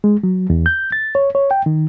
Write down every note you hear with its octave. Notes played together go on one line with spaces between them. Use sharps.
G#3
F#3
E2
G6
A6
C#5
C#5
G5
D#3